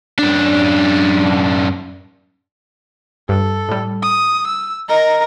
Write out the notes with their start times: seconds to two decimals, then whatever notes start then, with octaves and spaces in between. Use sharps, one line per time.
0.19 F#2 D4
3.29 G2 A4
3.69 A2 G3
4.02 D#6
4.47 E6
4.89 A#4 D#5 A#5